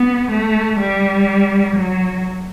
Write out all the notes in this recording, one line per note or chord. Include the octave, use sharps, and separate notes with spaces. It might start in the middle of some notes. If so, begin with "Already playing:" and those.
Already playing: B3
A3
G3
F#3